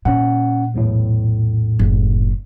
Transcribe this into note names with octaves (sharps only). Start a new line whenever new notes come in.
A#2 C#4 F#5
B1 E2 A2
F#1